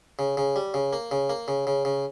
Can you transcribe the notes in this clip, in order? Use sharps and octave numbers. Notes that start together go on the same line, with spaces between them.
C#3
C#3
G3
C#3
A#3
C#3
A#3
C#3
C#3
C#3